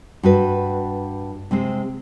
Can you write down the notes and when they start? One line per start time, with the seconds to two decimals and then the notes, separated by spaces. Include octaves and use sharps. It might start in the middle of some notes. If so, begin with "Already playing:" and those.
0.23 G2 F#4 B4
1.51 C3 G#3 C4